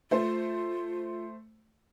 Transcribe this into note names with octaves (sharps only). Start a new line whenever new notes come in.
A3 F4 C5